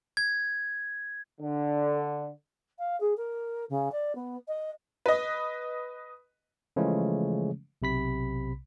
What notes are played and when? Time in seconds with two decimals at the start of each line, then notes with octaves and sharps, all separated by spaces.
0.17 G#6
1.41 D3
2.79 F5
3.00 G#4
3.17 A#4
3.70 C#3
3.92 D5
4.15 B3
4.48 D#5
5.06 B4 D#5
6.76 C#3 E3 F3 G#3 A3 C#4
7.82 B1 C3 B5 B6